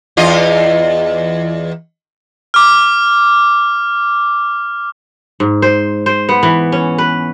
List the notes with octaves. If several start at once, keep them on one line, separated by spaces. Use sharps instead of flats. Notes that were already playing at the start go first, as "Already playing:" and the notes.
E2 F4 D#5
D6 F6
G#2
C5
C5
B3
E3
C#4
B4